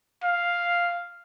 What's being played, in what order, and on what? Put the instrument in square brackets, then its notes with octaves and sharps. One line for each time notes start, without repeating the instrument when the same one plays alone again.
[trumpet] F5